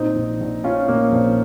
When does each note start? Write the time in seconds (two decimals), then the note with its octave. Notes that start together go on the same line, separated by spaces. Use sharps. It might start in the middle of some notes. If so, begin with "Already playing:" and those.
Already playing: A#2 C4 D#4
0.15 A#1
0.40 A#1
0.64 F3 C#4 F4
0.88 A#2 A#3
1.12 A#1 C4